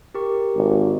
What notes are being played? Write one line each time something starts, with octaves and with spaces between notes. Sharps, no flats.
G4 A#4 C#6
G#1